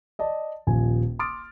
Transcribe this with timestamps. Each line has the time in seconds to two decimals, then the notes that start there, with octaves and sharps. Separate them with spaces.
0.19 D5 D#5 A5
0.67 D#1 A#1 F3 G#5
1.19 C6 D6 D#6 F6 A6 D7